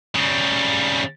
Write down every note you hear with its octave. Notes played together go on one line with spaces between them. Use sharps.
C#3 G3